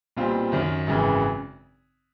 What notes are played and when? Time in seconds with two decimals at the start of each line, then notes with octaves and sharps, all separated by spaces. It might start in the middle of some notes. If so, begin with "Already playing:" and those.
0.17 B1 A#2 G3 C4 F4
0.52 F#2 D#3 F#3
0.87 G#1 F#2 C#3 E3